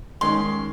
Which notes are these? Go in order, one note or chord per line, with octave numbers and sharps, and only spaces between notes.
D#3 G#3 C#4 C6